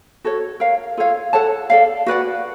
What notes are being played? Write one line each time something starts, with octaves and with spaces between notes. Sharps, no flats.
F#4 A4 C#5
A#4 C#5 F5
F4 A4 C#5 F5
A4 C#5 F#5 A5
A4 D5 F5
F#4 B4 D5 F#5